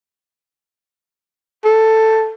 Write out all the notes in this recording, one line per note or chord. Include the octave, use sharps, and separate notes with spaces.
A4